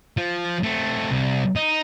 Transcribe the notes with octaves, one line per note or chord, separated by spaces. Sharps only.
F3
A3 C4
C2
D#4